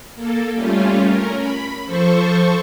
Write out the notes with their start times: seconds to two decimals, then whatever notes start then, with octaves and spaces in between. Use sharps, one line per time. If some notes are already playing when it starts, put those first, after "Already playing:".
0.15 A#3 A4
0.54 G3 A3 C#4 F4
1.03 C#4 A#4
1.38 B5
1.86 F3 A4 C5 C#6